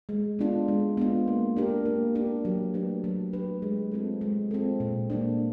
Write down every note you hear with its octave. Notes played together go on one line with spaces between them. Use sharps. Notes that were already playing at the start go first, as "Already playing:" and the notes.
G#3
B3 D4 F4
G#3
B3 D4 F4
A#3
D4 G4 A#4
A#3
D4 G4 A#4
F#3
A3 D4 G4 B4
F#3
A3 D4 G4 B4
G#3
C4 F4 A4
G#3
C4 F4 A4
A#2
G3 A#3 D4